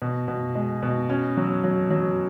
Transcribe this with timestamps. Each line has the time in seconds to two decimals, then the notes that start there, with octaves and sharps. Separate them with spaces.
0.02 B2
0.28 B2
0.55 G#3
0.83 B2
1.10 C#4
1.37 F#3
1.64 F#3
1.90 F#3